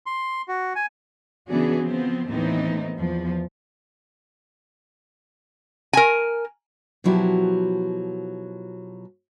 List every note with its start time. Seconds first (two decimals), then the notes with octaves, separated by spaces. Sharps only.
0.06 C6
0.48 F#4
0.75 G#5
1.49 C#3 E3 B3 D4 F#4 G#4
1.85 F3 B3 C4
2.29 D#2 A2 E3 B3 C4 D#4
2.98 E2 F3
5.93 A#4 G#5
7.04 B2 F3 F#3 E4 F#4 G4